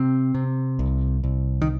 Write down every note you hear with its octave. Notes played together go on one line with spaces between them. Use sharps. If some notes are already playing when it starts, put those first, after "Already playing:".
Already playing: C3 C4
C3
C2
C2
D#3